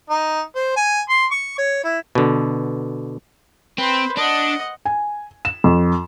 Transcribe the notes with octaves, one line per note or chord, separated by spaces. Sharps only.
D#4
C5
G#5
C6
C#6
C#5
E4
B2 D3
C4 B4 C5
D4 D#5 F#5
G#5
E7
F2